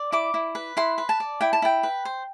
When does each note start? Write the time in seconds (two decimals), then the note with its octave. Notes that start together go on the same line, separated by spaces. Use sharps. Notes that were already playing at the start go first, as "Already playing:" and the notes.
Already playing: D5
0.12 E4 D6
0.34 E4
0.55 B4
0.77 E4 C6
0.98 B4
1.09 A5
1.20 D5
1.41 E4 G5
1.53 A5
1.62 E4 G5
1.83 B4
2.05 C5